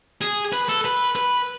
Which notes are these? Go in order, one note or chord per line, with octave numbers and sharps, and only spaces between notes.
G#4
B4
A4
B4
B4